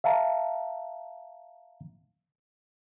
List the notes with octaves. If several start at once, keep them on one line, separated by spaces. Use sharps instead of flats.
E5 F5 A5 A#5